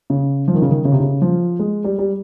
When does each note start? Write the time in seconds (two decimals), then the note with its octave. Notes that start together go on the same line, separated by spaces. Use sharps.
0.10 C#3
0.48 F3
0.54 D#3
0.62 C#3
0.69 D#3
0.85 C#3
0.92 C3
1.00 C#3
1.22 F3
1.59 G#3
1.84 G3
1.99 G3